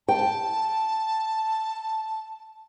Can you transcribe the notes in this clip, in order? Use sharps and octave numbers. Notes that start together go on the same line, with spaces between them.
G5 A5